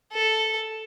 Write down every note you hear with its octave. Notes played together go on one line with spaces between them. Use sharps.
A4